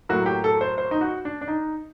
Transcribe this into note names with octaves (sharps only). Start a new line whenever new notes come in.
A2 F#3 A#3 F#4
G4
A4
C5
C5
D#4
F#4
D4
D4
D#4